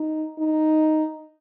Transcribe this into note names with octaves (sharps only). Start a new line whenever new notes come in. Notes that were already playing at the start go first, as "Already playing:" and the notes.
Already playing: D#4
D#4